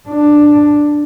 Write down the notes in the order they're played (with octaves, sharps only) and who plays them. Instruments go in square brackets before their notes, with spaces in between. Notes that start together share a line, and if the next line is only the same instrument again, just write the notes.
[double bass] D4